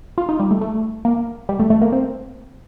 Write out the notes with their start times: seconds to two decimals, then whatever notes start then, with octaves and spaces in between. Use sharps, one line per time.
0.18 F4
0.29 D#4
0.40 G3
0.51 A3
0.61 A3
1.05 A#3
1.49 G3
1.60 A3
1.70 A3
1.82 A#3
1.92 C4